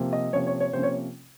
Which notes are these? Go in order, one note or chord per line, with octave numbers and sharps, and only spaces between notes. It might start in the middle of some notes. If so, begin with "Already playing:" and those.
Already playing: C3 F3 A#3
D#5
C3 F3 A#3 C#4 C#5
C#5
C#5
C3 F3 A#3 C#4 C5
C#5